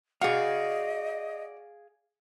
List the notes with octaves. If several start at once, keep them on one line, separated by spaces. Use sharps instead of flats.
F#4 G#4 D5 D#5 F5